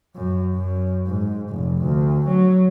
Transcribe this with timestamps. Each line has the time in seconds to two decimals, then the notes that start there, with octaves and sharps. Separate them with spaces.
0.15 F#2
0.54 F#2
1.06 G#2
1.50 F1
1.82 D2
2.28 F#3